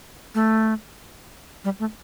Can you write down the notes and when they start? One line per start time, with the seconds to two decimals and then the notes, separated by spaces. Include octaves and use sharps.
0.35 A3
1.64 G3
1.80 A3